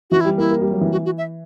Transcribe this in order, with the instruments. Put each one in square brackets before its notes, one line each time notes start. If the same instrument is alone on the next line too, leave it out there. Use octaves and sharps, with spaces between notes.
[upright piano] E3 [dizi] F#4
[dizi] E4
[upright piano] G3
[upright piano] A#3 [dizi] E4
[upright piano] A#3
G3
F#3
E3
[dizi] F#4
F#4
E5